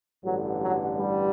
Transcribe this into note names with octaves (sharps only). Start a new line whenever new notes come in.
A1 G2 D3 F#3
F#3
G3